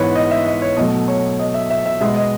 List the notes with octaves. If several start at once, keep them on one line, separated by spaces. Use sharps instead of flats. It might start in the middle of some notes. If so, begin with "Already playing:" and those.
Already playing: G#2 E3 B3 B4 C#5
D#5
E5
D#5
C#5
B2 F#3 A3 D#5
C#5
D#5
E5
E5
E5
B2 G#3 B3 E5
D#5